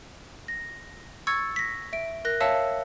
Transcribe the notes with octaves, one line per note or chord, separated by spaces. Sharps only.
A#6
C#6 E6 G#6 A6 C#7
A#6 B6
E5 D7
A#4 F#6 A#6
C#5 E5 F5 A5 E6 C#7